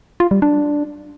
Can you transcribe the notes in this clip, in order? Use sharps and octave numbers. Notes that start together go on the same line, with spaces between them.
F4
G3
D4